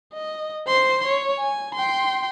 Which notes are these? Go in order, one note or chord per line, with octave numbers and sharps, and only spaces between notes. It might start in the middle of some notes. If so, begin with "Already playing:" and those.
D#5
C5 C6
C#5
G#5
G5 C6